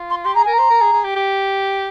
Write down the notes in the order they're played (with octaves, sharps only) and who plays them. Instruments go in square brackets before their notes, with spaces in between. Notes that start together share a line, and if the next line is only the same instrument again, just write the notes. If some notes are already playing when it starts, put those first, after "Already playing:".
Already playing: [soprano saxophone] F4
[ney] C6
[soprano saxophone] G4 [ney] C6
[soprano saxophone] G#4 [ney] A#5
[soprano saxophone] A#4 [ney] G#5
[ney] A#5
[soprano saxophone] C5
A#4
G#4
G#4
G4
G4